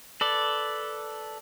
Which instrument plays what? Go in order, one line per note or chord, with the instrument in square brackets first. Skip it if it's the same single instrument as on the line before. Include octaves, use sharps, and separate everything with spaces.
[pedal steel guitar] A4 B4 D5